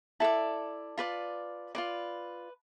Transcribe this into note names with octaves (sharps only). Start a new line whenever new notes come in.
E4 A4 D5 A5
F4 B4 D5
F4 B4 D5